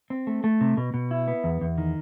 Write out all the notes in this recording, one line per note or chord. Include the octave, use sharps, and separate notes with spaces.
C4
A3
A3
C3
B2
B2
E4
B3
E2
E2
D#3